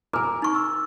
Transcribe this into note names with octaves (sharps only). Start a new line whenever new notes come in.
A#4 G#5 A#5 D6 F6
D#4 C#6
E6